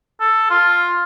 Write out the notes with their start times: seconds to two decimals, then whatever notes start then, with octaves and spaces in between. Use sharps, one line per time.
0.20 A4
0.50 F4